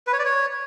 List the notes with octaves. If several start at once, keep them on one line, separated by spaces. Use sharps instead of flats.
B4
C#5
D5
C#5